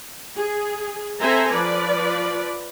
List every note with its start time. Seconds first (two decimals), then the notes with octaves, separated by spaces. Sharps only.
0.36 G#4
1.20 C4 A4 C5 E5 G#5 A#5
1.53 F3 B4 D5